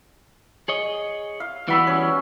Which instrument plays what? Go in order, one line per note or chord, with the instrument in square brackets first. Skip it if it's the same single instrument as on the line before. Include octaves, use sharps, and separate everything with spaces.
[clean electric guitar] G#4 C#5 D#5
[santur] F5
[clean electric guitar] E3 G3 B3 [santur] F#4 B5 E6
[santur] C#4